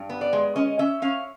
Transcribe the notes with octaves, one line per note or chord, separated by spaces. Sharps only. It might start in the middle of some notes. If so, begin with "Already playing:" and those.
Already playing: G2
B3
D5
G#3
C#4 D#5
C#4 E5
C#4 F5